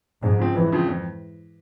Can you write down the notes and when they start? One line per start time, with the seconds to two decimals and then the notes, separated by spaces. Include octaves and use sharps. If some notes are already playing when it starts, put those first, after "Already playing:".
0.22 F2 G#2
0.39 C#3 F3 C4
0.55 F2 E3
0.72 C#3 F3 C4
0.88 F2